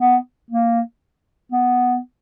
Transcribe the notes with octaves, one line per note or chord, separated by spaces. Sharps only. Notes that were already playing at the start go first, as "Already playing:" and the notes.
B3
A#3
B3